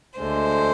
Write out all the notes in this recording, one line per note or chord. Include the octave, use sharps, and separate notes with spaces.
D2 D3 G#3 C5